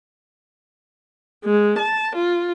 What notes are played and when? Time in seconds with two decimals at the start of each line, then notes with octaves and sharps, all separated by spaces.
1.45 G#3
1.78 A5
2.16 F4